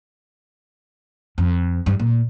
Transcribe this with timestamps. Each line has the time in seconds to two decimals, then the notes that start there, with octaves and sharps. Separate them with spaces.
1.38 F2
1.86 G2
2.00 A#2